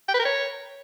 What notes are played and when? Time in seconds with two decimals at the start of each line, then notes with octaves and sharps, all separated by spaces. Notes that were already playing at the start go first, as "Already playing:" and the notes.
0.08 G5
0.14 B4
0.19 A#4
0.25 C#5